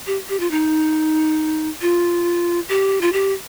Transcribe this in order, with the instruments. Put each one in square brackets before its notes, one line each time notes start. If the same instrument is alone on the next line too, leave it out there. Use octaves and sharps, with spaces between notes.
[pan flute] G4
G4
F4
D#4
F4
G4
F4
G4